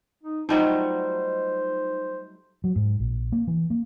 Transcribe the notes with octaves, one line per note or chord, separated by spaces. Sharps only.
D#4
F#3 G3 A3 D#4 F4 C5 D#5
F#3
G#2
A#1
A#3
E3
A#3